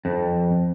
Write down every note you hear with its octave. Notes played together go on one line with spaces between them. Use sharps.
F2